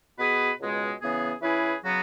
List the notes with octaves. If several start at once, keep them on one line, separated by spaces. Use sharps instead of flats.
B2 B3 G#4 B4
C#2 B2 G#3
C#3 E3 B3 G#4
E3 C#4 E4 G#4 B4
C#3 F#3 B3 F#4